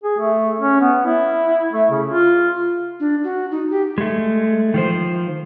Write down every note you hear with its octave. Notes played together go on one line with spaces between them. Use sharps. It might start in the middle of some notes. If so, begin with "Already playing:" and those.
G#4
A3
C#4
B3
E4
A3
C#3
F4
D4
F#4
D#4
G4
G#3 A3
D#3 F3 C5